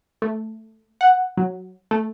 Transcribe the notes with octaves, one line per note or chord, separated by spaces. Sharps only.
A3
F#5
F#3
A3